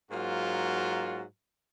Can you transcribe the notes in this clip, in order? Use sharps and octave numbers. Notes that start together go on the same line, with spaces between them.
G#2 F#3 A#3 F4 F#4